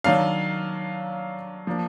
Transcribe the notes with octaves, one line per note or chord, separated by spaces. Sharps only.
D#3 F#3 D4 F5
F3 A#3 D4